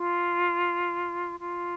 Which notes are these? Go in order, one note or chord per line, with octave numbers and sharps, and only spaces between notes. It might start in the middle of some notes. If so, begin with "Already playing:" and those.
Already playing: F4
F4